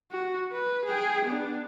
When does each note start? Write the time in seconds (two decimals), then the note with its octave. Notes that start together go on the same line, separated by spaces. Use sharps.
0.11 F#4
0.53 B4
0.85 G#4 G5
1.25 B3 D4